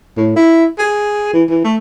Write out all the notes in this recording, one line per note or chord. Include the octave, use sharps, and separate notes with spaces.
A2
E4
G#4
E3
E3
A3